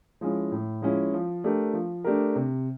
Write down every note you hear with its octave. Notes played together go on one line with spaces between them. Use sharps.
F3 G#3 C#4 E4
A2
F3 G#3 C#4 E4
F3
A3 D4 G4 A#4
F3
A3 D4 G4 A#4
C3